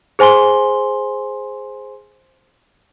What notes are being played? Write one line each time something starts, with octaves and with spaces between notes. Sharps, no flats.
G#4 C5 G#5 C6 G7